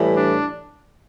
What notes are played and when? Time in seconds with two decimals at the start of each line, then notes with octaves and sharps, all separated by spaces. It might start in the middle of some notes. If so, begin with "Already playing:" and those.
Already playing: A2 E3 G3
0.15 D4